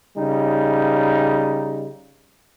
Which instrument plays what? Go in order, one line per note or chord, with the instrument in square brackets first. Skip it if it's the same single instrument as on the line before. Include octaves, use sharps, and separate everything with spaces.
[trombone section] C#3 G3 D#4